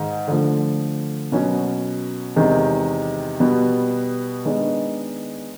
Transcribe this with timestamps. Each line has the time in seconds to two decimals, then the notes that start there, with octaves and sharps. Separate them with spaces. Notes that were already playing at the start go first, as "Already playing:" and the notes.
Already playing: G#2 D#3 G#3
0.28 D3 F3 A3
1.32 B2 F#3 A#3 C#4 F#4
2.36 E2 C3 D#3 G#3
3.40 B2 G3 B3
4.45 D#3 G#3 B3 D4